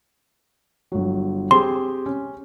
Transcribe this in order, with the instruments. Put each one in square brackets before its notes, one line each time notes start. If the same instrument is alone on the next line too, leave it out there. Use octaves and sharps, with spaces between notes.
[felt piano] G1 F#3
[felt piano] C4 G4 G#4 [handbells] C6
[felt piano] C#4